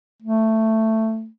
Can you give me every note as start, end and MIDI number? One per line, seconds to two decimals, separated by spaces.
0.22 1.28 57